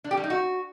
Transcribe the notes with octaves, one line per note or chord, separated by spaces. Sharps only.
D4
G4
G3
D#4
F#4